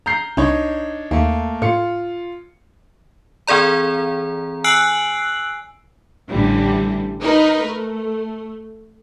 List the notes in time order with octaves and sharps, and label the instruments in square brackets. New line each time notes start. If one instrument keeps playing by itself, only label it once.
[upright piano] A#5 G6 C7
[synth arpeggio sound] C2 [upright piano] D4 D#4 C#5
[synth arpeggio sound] D#2 [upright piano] A3 A#3
[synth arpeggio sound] A2 [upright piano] F4 C#7
[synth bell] E3 C4 G#4 D5 A#5
G#5 E6 F#6 C7 D7 F#7
[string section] A1 D3 E3 G3
D#4 A#4 B4
A3